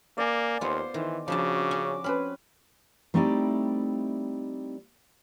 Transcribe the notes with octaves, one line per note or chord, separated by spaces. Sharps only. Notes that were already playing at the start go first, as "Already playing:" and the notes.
A#3 D5 G#5
D#2 B3 F4 C5 C6
D#3 E3
C#3 F3 D4 F#4 A5 B5 D6
C#4
C4 C#4 B4 B5
G3 A3 C4 D#4 E4 D5